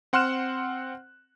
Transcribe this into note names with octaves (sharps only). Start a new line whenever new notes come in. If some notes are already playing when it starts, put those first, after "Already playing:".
C4 F#5 C6 F6 F#6 E7